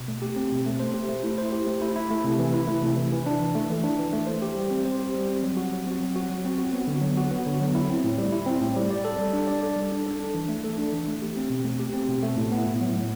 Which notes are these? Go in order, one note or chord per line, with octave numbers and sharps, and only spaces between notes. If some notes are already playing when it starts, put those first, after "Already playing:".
Already playing: B2
A3
G4
C4
B2
A3
C5
G4
A3
E4
C5
G4
A3
E4
E4
A3
C3
E3
E4
A3
C3
E3
E3
D4
E3
A3
E3
D4
E3
A3
C5
G4
G3
C4
C5
G4
G3
C4
F#3
F#4
F#3
C4
F#3
F#4
F#3
C4
F#4
B3
D3
F#3
F#4
B3
D3
F#3
E4
C4
A2
G3
E4
C4
A2
G3
D5
A4
G3
D4
D5
A4
G3
D4
A4
D4
E3
A3
A4
D4
E3
A3
G4
C4
B2
A3
G4
C4
B2
A3
A2
B3
A2
F#3
A2